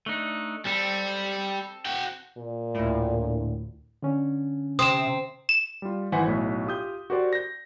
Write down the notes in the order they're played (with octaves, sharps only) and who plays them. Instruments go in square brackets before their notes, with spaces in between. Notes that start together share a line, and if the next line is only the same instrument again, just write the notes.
[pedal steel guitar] A3 D4 D#4
[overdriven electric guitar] G3 [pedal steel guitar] C4 A4
[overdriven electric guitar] F#4 G5
[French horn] A#2
[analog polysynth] D2 A2
[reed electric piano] D3 C#4
[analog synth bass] C3 [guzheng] C4 [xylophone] D#6 E7
[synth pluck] E7
[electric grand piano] G3 F4
G#1 E3 C5 F#5 G#5 B6
B1 A2
F4 G4 D#6 G6
F#4 G4 A#4 C5 D5
G6 A#6